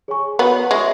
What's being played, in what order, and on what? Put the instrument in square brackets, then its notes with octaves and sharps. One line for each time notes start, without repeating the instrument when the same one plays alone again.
[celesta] G#4 C#5 G#5 C#6
[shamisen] B3 [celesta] F#4 C#5 F#5 B5
[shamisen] G#3 [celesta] C#5 E5 C#6